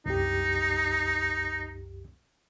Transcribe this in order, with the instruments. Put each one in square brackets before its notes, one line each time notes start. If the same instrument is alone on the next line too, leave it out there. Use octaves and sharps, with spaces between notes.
[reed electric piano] C2 F#2 G4 [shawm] D#4